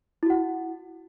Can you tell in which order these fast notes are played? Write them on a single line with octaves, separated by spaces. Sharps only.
E4 F#4 F#5